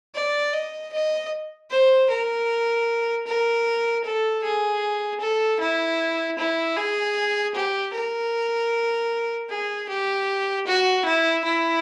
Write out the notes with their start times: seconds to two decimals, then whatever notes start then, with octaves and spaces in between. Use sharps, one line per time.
0.15 D5
0.53 D#5
0.93 D#5
1.71 C5
2.10 A#4
3.27 A#4
4.04 A4
4.43 G#4
5.21 A4
5.60 E4
6.38 E4
6.77 G#4
7.55 G4
7.94 A#4
9.50 G#4
9.89 G4
10.67 F#4
11.05 E4
11.45 E4